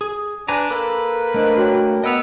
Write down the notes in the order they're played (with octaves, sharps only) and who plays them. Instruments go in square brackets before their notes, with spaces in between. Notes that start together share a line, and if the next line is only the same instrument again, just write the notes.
[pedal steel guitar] G#4
[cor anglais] D4 [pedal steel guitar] B4 G#5 A#5
[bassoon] A#3 [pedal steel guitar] A4 [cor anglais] B4
[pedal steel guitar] A3 D4 [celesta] A#4 C5 D#5
[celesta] F#4 C#5 G5
[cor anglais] B3 [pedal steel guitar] D#5 E6 [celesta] D7 F7